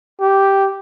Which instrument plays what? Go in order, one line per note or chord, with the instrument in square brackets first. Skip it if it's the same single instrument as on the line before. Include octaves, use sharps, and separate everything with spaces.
[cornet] G4